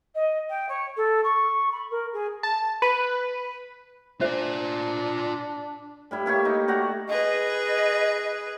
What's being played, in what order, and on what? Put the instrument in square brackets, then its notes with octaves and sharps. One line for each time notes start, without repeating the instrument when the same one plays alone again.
[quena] D#5
G5
C#5
A4
C#6
B5
A#4
G#4
[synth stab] A5
B4
[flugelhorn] D4 [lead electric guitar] F4 D5 [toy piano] C5 E5
[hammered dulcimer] A2 G3 E4
A#3 E4 G4 C#5
D#4
A3 F#4 D5 A#5
[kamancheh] G#4 B4 [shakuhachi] D#5